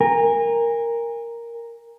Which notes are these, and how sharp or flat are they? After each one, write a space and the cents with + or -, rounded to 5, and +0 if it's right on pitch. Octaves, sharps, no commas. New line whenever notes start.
A#4 +0 G#5 -35